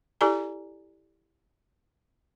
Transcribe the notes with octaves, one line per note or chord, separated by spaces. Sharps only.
E4 G4 A4 D5 G#5 A#5